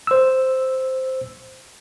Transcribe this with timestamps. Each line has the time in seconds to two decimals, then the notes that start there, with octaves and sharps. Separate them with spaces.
0.07 C5 E6